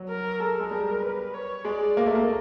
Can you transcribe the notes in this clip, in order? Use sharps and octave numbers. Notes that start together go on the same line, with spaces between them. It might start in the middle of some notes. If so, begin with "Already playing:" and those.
Already playing: F#3
A#4
G#3 A4
G#3
G3 A#4
B4
C#5
G#3 D5
A#3 D#5
A3
A#3